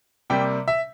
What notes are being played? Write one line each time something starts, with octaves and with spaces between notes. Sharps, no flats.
C3 G3 A#3 G5
E5